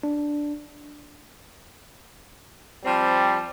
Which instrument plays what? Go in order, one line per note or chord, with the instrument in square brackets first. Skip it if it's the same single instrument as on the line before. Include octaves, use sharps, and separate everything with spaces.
[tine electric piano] D4
[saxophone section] F3 C4 [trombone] G3